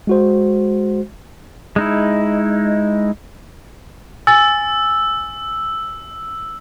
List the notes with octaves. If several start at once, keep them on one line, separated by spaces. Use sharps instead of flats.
G#3 F#4 C5
G#3 D#4 E4
G#5 E6 A6